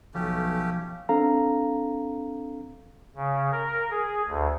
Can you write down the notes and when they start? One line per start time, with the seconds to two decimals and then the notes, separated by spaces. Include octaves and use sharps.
0.14 B1 F3 A3 C#4 G4
1.09 C4 D4 A4 F5 A#5
3.16 C#3
3.52 A#4
3.91 G#4
4.27 D2